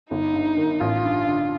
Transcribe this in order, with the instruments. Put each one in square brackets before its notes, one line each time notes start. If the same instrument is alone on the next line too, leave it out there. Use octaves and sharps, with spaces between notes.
[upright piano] G1 [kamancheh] D#4
[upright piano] G2
D#3
[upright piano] A1 [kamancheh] F4
[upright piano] G2
D3